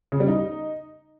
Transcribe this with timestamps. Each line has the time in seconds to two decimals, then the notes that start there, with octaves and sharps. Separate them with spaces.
0.12 C#3
0.20 G3
0.28 D#4